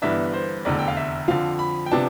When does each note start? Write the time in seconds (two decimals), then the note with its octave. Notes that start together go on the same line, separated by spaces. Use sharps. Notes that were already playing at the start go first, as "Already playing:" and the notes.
0.02 G1 G2 E3 B3 D4 E5
0.34 C5
0.65 F1 E2 D3 D5
0.79 G5
0.88 F5
0.97 E5
1.28 F2 D3 F3 F5
1.59 B5
1.86 G5
1.91 C3 F3 B3 D4 A5